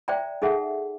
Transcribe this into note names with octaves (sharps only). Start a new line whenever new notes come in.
C5 D5 E5 G5 A#5
D#4 G#4 A4 E5 F#5